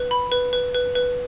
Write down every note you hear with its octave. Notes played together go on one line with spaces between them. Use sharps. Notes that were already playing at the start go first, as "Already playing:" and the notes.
Already playing: B4
B5
B4
B4
B4
B4